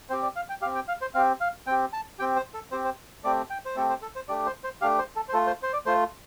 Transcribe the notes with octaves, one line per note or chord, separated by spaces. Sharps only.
C4 G4 C5
D5
F5
G5
C4 G4 F5
G5
F5
C5
C4 G4 F5
F5
C4 G4 G5
A5
C4 G4 G5
C5
A4
C4 G4 C5
C5
A3 C4 G4 D5
G5
C5
A3 C4 G4 A4
C5
A4
C5
A3 D4 G4 D5
C5
C5
A3 D4 G4 F5
C5
A4
C5
A3 F4 A4
C5
C5
D5
A3 F4 C5